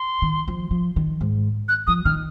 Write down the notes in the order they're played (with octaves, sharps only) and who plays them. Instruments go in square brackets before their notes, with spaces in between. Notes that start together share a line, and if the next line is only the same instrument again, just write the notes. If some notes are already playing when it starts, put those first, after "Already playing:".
Already playing: [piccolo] C6
[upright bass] D#3
F3
F3
D#3
G#2
[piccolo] F#6
[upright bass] F3 [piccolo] D#6
[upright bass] D#3 [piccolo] F6